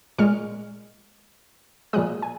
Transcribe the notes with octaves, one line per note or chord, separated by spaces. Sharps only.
A#2 G#3 C#6 F6
A#2 F3 G#3 D#6 F#6
G#5